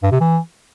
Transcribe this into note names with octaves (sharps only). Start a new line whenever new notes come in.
G2
C3
E3